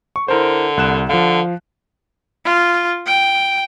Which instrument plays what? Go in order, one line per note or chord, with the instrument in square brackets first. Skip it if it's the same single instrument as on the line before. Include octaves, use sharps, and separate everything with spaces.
[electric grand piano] C#6
[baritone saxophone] D3 [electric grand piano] E4 A#4 C5
[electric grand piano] C2 F#6 E7
[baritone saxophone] D3 [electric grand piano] F3 F5
[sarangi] F4
G5